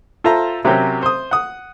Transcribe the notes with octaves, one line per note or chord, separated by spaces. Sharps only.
F4 A4 C5 E5 A#5
C3 F#3 C4 C#4 G4 A#4
C5 D#6
F#5 D#6